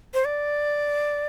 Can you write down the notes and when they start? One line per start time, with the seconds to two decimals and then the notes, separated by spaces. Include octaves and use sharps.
0.14 C5
0.25 D5